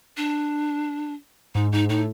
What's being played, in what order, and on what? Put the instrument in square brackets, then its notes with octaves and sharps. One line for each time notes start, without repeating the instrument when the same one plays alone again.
[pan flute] D4
[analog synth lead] G#2 [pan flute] D#4
[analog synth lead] G#2 [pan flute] D#4
[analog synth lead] A2 [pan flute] D#4